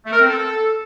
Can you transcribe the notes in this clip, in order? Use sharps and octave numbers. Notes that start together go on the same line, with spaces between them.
A3
A#4
C4
A4